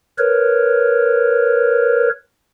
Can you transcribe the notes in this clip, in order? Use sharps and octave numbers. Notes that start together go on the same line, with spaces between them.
A#4 B4 C#5